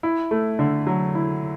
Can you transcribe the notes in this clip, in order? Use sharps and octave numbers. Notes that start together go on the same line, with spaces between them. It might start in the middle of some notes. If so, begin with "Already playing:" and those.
E4
A3
D3
F#3
E4